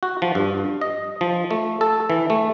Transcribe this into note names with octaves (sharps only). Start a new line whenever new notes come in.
F#4
F3
G2
D#5
F3
A3
A4
E3
A3